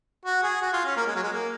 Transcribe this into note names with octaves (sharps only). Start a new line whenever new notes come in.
F#4
G#4
F#4
F4
C#4
A#3
G#3
F#3
G#3
A#3